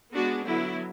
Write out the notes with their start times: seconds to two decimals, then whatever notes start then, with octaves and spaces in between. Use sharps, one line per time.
0.15 G#3 B3 D4 F#4
0.47 D3 F#3 B3 E4